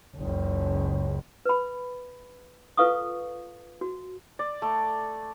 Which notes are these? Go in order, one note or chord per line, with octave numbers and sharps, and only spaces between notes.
F#1 C#2
B4 B5
F4 A4 B4 F5 C#6 D#6
F#4
D5
A3